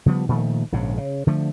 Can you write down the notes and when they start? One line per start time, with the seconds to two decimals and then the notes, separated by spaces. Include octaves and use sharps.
0.06 C#3 F3 G3 B3
0.28 A#2 D#3 F3 A3
0.72 A#1 G#2 C#3
0.97 C#3
1.27 D3 F3 A3